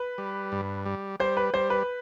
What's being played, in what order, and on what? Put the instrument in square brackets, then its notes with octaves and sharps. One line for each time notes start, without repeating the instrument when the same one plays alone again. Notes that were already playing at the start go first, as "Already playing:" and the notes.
Already playing: [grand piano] B4
[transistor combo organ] G3
G2
G3
[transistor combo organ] G3 [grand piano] C5
[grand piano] B4
[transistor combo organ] G3 [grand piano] C5
[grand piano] B4